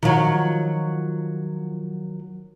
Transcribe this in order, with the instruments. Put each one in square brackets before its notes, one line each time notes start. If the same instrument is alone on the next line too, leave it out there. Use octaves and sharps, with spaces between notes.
[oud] D#3 F3 F#3